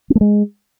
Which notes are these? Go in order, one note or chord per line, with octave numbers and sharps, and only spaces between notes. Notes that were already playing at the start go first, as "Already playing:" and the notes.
C4
A3
G#3